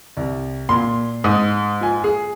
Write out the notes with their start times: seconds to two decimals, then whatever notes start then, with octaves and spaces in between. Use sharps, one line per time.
0.17 C2
0.69 A#2 C6
1.24 G#2 D#6
1.81 F4 G#5
2.04 G#4